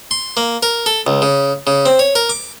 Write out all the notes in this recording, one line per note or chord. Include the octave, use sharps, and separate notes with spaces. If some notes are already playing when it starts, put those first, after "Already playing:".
C6
A#3
A#4
A4
C#2
C#3
C#3
C4
C#5
A#4
D6